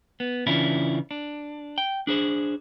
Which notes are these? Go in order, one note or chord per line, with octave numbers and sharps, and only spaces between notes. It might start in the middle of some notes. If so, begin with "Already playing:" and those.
B3
C#3 E3 C#4 D4 E4 F4
D4
G5
D4 G#4 C5